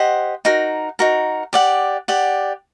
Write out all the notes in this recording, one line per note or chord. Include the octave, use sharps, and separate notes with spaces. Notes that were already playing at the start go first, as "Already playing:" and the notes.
Already playing: G4 C5 D#5 F#5
D#4 F#4 A#4
D#4 F#4 A#4
G4 D5 F#5
G4 D5 F#5